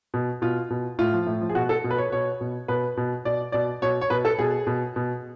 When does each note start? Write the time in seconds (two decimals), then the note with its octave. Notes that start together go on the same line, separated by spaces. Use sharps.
0.14 B2
0.42 B2 F4
0.70 B2
0.99 A2 F4
1.13 F3
1.27 A2
1.41 F3
1.49 G#4
1.55 B2 F#4
1.69 A4
1.84 B2
1.91 B4
1.98 C#5
2.12 B2 C#5
2.41 B2
2.68 B2 B4
2.97 B2
3.25 B2 D5
3.52 B2 D5
3.82 B2 C#5
4.01 C#5
4.10 B2 B4
4.25 A4
4.39 B2 G#4
4.67 B2
4.96 B2